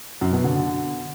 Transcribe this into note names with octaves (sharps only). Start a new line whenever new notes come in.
F#2
B2
D3